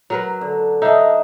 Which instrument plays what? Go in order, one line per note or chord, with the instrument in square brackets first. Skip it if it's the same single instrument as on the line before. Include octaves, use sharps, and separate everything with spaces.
[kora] F#3 A#4 B4
[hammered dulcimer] D3
[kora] D4 D#4 [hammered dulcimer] D#5 E5